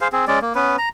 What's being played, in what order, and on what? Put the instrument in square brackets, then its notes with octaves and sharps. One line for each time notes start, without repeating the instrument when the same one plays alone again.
[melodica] G#4 C5 F5
C4 G#4
G#3 C#4 D5
A#3
B3 C#4 B4
A#5